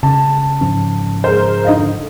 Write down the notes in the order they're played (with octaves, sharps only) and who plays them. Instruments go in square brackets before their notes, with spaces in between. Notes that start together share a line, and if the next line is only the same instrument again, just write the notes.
[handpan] C#3 [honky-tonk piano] A5
[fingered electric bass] G#2 F3 C#4
[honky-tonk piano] G#3 A#4 C5
D#4 D#5 F5
D3